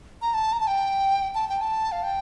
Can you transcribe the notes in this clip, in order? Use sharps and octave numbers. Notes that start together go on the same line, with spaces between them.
A#5
A5
A#5
A5
G5
A5
G5
A5
F5
G5